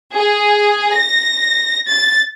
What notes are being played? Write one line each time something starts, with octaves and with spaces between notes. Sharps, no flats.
G#4
A#6
A6